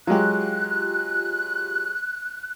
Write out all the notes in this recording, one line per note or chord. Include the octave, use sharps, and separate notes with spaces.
F#3 G#3 F4 G4 F#6